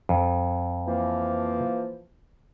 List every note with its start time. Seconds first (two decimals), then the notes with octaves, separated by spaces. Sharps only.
0.09 F2
0.86 E3 F3 A#3